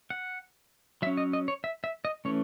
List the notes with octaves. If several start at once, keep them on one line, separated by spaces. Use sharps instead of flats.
F#5
F#3 C#4 E5
D#5
D#5
C#5
E5
E5
D#5
E3 A3 C#4 C#5